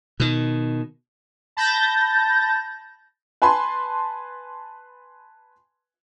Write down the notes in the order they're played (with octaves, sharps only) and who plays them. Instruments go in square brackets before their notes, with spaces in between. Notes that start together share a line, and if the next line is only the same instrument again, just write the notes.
[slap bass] B2 D#3
[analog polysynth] A5 B5 G6 A6 A#6
[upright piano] B4 G#5 A5 B5 C6